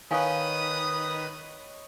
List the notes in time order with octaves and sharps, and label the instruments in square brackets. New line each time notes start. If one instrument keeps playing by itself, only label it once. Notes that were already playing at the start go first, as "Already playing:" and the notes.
[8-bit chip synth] D#3 B4 [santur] C#5 D#5 [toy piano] F5 G#5 [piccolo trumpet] D#6